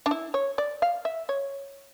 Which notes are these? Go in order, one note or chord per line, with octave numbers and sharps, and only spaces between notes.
D4
E4
C#5
D5
F5
E5
C#5